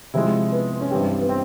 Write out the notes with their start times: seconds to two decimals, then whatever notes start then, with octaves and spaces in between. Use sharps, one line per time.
0.14 C3 F3 G#3 E4
0.52 B3
0.80 C#4
0.90 G2 E3 G3 C4
1.21 B3
1.29 C4